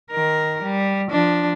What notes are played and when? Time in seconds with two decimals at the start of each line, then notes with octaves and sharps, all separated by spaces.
0.11 D#3 A#4
0.63 G3
1.11 F3 D4